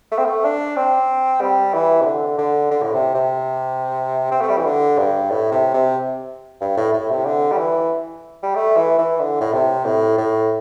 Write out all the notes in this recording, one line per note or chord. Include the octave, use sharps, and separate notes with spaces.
A3
C4
A3
D4
C4
G3
E3
C3
D3
D3
D3
A2
C3
C3
C4
A3
G3
E3
D3
G2
A2
C3
C3
G2
A2
A2
C3
D3
G3
E3
G3
A3
E3
E3
D3
A2
C3
A2
A2